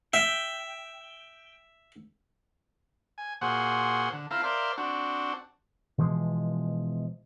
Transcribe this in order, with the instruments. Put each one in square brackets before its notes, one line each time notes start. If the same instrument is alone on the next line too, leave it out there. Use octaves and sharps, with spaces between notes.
[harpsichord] E5 [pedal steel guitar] G5
[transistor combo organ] G#5
A#2 F#4 G#4 C5 F#5
D3
C4 E4 F4 A4 F5 A#5
A#4 C5 D5 E5 F5
C4 D4 F#4
[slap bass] B2 E3 F3 G#3